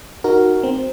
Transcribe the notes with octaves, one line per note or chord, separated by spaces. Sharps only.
D#4 F#4 A#4
C4